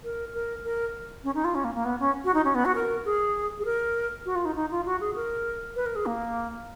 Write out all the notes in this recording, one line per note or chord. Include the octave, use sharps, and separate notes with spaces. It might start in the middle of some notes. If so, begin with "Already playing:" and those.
A#4
A#4
A#4
C#4
D#4
F4
C#4
A#3
A#3
B3
C#4
F#4
D#4
C#4
B3
F#4
A#4
G#4
G#4
A#4
F#4
F4
D#4
D#4
F4
F#4
G#4
A#4
B4
A#4
G#4
A#3